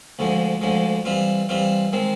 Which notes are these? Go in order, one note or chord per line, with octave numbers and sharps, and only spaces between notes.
D2 D3 F3 G#3
D2 D3 F3 G#3
E3 G3 C4 F4
E3 G3 C4 F4
D#3 G#3 C4